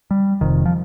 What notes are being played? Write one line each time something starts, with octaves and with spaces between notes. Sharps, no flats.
G3
F1 F2 C3 D#3
F3